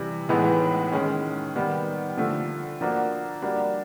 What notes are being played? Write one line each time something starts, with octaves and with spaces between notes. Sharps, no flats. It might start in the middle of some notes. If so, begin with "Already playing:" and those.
Already playing: C3 E3 G3
A2 E3 G#3 B3 D#4
D#3 G#3 C#4
D#3 G3 B3
D3 F3 A3
F3 A#3 D4 F#4
G3 A#3 D4 F#4